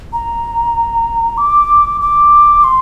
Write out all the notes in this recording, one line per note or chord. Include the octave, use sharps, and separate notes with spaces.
A#5
D6
D6
C6